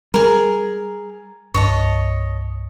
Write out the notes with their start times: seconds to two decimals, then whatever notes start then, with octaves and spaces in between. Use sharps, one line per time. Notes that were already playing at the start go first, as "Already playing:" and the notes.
0.14 G3 G#4 A#4
1.54 C2 G2 C#5 D#5 A5